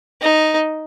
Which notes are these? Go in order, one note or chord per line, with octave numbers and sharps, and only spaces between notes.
D#4